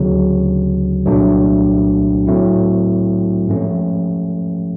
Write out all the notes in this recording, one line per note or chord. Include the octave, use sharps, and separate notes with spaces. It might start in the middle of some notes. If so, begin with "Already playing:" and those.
Already playing: D2 C#3 F#3
C2 A#2 F#3 A3 D4
A2 F#3 A3 C4 E4
G#2 F3 A3 C#4